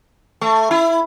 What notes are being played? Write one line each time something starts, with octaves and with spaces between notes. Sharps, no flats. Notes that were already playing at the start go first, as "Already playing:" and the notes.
A3
E4